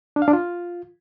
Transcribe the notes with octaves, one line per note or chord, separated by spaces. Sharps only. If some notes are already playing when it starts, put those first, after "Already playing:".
D4
F5
D4
F4